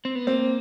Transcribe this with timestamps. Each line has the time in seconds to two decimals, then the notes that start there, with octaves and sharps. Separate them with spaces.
0.05 C4
0.15 B3
0.26 A#3 C4